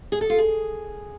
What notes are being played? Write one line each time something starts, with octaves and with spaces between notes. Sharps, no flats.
G#4
A4
F4
G#4